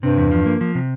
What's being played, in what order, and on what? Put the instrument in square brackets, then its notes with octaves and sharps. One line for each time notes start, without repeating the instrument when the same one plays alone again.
[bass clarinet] G2 [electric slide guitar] C3
[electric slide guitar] E2
F3
A#3
F3
C3